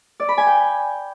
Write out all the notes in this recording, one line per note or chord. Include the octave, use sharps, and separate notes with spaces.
D5
B5
G#5
G5